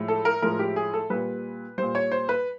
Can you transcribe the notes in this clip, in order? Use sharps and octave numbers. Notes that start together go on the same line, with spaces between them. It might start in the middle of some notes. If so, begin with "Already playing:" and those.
Already playing: A2 F3 G#3
A4
A#4
A2 F3 G#3 A#4
G4
G#4
A4
A#2 G3 B4
A#2 G3 C5
C#5
C5
B4